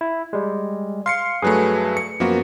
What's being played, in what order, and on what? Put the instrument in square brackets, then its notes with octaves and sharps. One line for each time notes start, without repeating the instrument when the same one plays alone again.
[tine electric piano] E4
G3 G#3
[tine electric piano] F5 [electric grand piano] C6 C7 C#7
[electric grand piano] G2 F#3 A3 [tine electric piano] G#4 B4
[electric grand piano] C#7
[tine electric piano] F#2 F3 [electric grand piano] A#3 B3 F#4